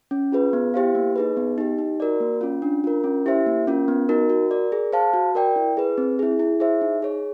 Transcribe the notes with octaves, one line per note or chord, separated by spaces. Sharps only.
C#4
F4 G#4 B4
B3
E4 G4 C5 F5
A#3
D#4 G#4 B4
B3
D#4 G4
D#4
F#4 A#4 D5
A#3
C#4 F4
D4
F4 A#4
C#4
E4 G4 C5 E5
A#3
C#4 F4 A#4
B3
D#4 F#4 A#4
F#4
A#4 D5
G#4
C5 F5 A5
F#4
A#4 D5 G5
E4
G#4 B4
C4
E4 G#4
E4
G#4 C5 E5
D#4
G#4 C#5